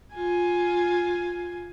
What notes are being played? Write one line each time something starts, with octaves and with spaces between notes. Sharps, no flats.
F4 G#5